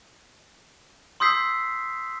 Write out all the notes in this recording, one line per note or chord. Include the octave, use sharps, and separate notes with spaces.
C6 D#6 E6 G6 B6 C7